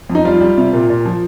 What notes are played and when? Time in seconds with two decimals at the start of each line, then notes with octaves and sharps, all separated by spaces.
0.10 F2
0.15 D#4
0.25 G3 F4
0.41 G3
0.58 C3
0.73 A#2
0.90 A#2
1.05 F3